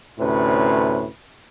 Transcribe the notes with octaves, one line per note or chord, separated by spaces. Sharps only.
D2 A2 C3 C#4 B4